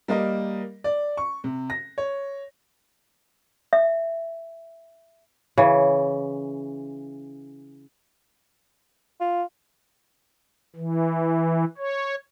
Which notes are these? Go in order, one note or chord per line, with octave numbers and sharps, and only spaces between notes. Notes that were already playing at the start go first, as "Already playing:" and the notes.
G3 A#3 A#4 D#5
D5
C#6
C3
A#6
C#5
E5
C#3 E3
F4
E3
C#5